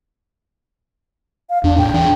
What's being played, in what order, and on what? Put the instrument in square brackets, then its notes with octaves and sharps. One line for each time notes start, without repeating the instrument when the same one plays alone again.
[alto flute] F5
[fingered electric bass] E2 [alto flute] D4
[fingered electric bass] A2 [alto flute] G5
[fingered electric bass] E3 D4